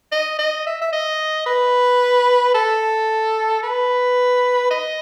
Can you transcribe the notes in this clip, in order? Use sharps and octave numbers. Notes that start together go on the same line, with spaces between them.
D#5
D#5
E5
E5
D#5
B4
A4
B4
D#5